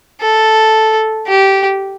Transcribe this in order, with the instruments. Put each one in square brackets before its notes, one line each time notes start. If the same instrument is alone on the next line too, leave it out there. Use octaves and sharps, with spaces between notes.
[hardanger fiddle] A4
G4